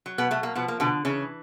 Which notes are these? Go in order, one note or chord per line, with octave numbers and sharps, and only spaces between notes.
F#3
B2 B3
B2 A3
A#3
B2 F3 B3
A#3
B2 D3 B3
C#3 E3 C#4